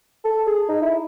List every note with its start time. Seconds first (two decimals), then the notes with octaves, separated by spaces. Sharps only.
0.25 A4
0.47 G#4
0.69 D#4
0.82 E4